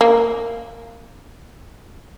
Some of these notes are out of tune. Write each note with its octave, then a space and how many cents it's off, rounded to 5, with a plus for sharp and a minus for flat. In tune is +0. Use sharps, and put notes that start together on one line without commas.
A#3 -10